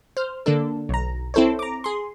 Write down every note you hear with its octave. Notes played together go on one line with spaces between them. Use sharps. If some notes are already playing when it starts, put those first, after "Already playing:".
C5 F6
D3 A#3 D4 A4
B1 A#5
C4 E4 A4 C5 C#5
A#5 D6
G#4 C6